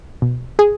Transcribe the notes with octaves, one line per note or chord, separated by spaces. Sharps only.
B2
G#4